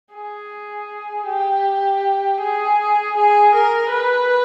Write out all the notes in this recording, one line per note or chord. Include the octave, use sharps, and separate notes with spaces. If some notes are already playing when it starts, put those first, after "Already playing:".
G#4
G4
G#4
G#4
A#4
B4